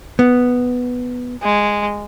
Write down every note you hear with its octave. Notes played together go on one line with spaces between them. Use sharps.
B3
G#3